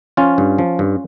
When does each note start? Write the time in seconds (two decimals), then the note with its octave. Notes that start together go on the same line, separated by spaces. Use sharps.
0.17 F3 C#4 F4
0.38 G2
0.58 F3
0.79 G2